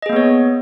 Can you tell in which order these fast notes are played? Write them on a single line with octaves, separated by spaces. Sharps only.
D#5 G#4 A#3 B3 C#5